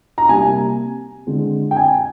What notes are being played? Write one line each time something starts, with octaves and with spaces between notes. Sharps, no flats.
A#5
C3 G3 A#3 G#5
D3 G#3 C4
G5
G#5